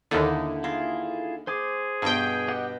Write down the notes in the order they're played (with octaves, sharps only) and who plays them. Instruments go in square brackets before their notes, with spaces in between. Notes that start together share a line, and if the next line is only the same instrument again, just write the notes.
[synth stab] D#2 D3 [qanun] A#3 D#4 E4
[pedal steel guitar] E4 F4 G#4 [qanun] A#4
[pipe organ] G#4 [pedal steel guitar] C5 G#5 D6
[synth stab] G2 G5 [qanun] B2 C#6
[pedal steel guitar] G4 D#5 F#5